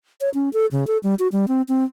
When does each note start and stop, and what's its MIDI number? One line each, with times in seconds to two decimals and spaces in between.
0.21 0.29 73
0.34 0.49 61
0.53 0.66 69
0.72 0.87 49
0.87 0.98 69
1.03 1.15 55
1.19 1.28 66
1.32 1.46 55
1.48 1.62 60
1.69 1.84 60